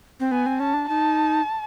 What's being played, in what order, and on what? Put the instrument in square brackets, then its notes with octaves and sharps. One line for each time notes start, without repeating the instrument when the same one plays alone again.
[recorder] C4
[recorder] B3 [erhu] G#5
[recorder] C4
[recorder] C#4 [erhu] A5
[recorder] D4
[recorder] D#4 [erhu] A5